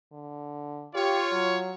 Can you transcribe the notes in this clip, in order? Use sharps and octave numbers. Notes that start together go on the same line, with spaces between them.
D3
F4 G4 C#5
F#3